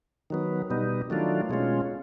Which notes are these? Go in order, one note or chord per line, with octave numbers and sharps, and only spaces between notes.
D#3 F#3 B3
B2 G3 B3 D#4
D#3 F#3 A3 D4 F4
B2 G#3 C#4 F4